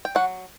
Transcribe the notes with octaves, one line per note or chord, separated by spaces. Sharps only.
G5
F#3 F#4 F#5